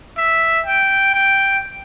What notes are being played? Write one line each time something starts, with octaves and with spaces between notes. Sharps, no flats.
E5
G5
G5